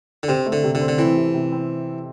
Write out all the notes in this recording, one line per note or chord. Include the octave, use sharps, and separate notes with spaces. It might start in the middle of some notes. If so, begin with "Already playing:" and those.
D3
C3 C4
A3
D3
C3
D3
C4
D3
E3 C4
C3
C3
C4